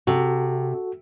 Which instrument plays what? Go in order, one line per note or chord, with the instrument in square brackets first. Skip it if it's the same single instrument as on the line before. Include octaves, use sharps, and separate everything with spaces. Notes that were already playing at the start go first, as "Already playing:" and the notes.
[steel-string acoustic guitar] C3 [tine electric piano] F#4 A4